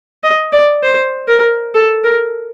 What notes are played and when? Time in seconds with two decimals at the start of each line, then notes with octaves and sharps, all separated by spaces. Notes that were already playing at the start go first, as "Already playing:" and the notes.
0.24 D#5
0.53 D5
0.83 C5
1.28 A#4
1.74 A4
2.04 A#4